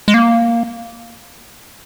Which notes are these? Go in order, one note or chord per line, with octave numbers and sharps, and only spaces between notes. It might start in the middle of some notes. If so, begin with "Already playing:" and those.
G#3
A#3